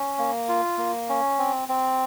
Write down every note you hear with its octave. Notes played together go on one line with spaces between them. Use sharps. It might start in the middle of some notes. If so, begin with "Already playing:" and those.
Already playing: C#4
A#3
F4
A#3
C#4
C4
C4